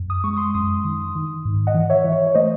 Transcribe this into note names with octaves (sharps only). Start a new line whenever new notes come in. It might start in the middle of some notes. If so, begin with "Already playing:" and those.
Already playing: F#2
D#6
G#3 C#6
C6 D#6
F#2 C6 D#6
D#3
D#3
G#2
D#5 F#5
E3
C#5 E5
E3
C#5
C#5
A3 C5 D#5